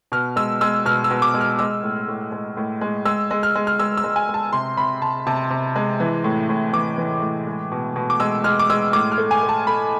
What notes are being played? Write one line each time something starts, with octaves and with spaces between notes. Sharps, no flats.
B2 F6
G#3 E6
G#3 E6
B2 F6
E6
B2
D6
G#3
F6
G#3 E6
A2
A2
G#3
A2
G#3
G#3 E6
G#3
F6
G#3
F6
G#3 E6
E6
G#3
G#5
G#3
A5
C3 C6
C3 B5
C3 A5
C3 A5
C3
G#3
E3
A2
A2
E3 D6
E3
A2
G#3
B2
B2
D6
G#3 E6
G#3 F6
D6
G#3 E6
A2 D6
F6
A3
G#5
A3
A5
A3 B5